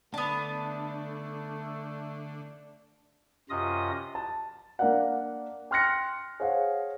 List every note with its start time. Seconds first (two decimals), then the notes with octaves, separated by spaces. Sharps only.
0.14 D3 A3 B3 D4 A5
3.50 F#2 C3 F4 D#5 D#6
4.15 A5
4.79 A#3 D4 A#4 D5 F5 F#5
5.71 G5 C6 F6 F#6 A#6 C#7
6.40 G#4 C5 C#5 F5 F#5